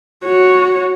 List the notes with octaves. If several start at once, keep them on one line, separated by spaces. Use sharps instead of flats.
F#4 C#5